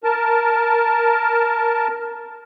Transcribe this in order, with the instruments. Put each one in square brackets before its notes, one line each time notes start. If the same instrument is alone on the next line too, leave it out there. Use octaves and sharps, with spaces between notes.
[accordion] A#4 A5